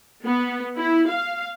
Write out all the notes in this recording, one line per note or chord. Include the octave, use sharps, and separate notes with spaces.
B3
E4
F5